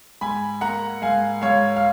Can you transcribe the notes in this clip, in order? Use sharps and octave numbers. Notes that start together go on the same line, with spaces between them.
G#2 G#5 B5
A#3 F#5 A#5
G#2 F5 G#5
G#2 C#5 F5
F5